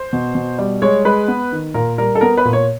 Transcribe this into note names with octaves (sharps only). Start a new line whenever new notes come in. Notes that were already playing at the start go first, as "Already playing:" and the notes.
Already playing: C5
B2
B2
G3
G#3 C#5
G#3 B4
B3
D#3
A#2 A#4
G3 A#4
A4
B3 A#4
B4
A#2
C#5